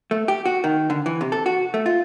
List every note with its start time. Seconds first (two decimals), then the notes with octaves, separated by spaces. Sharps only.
0.11 A3
0.28 G4
0.45 F#4
0.64 D#3
0.90 D3
1.06 E3
1.21 C3
1.32 A4
1.46 F#4
1.74 A3
1.86 F4